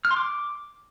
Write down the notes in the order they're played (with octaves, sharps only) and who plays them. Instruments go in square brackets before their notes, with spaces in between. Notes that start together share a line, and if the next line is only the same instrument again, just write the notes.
[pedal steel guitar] F6
C6
D6